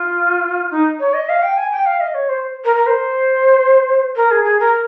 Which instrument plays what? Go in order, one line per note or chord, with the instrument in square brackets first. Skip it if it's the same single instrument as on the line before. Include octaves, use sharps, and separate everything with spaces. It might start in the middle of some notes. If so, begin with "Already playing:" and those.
Already playing: [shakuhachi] F4
D#4
C#5
D#5
F5
G5
G#5
G5
F5
D#5
C#5
C5
A#4
A#4
C5
A#4
G#4
G#4
A#4